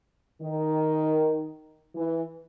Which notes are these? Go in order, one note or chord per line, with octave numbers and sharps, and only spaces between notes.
D#3
E3